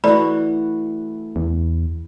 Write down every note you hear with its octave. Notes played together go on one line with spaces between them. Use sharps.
E3 A3 F#4 D5 B5
E2